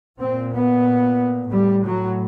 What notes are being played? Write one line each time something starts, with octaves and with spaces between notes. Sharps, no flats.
A#2 C4
B3
A2 G3
F#3